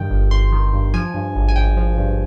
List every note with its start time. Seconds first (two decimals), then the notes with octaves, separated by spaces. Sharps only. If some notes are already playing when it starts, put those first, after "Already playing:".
Already playing: G2 D#3 G5
0.10 G1
0.31 G1 C6
0.52 D#3
0.73 G2
0.94 F3 G#5
1.14 G2
1.35 G#1
1.49 G#5
1.56 G#1 G5
1.77 F3
1.98 G2